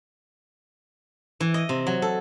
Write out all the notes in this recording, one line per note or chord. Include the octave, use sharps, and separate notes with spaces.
E3
D#5
C3
F#3
A4